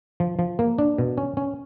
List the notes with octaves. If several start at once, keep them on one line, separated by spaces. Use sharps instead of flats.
F3
F3
A#3
D4
B2
C#4
C#4